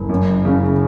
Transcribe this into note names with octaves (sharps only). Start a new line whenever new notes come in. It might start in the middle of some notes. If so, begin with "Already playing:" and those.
Already playing: F#1
F#2
C#3